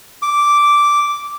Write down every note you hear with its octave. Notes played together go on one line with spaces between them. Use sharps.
D6